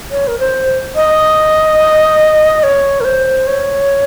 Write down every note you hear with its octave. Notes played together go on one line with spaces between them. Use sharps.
C#5
A#4
C5
D#5
C#5
A#4
C5
C#5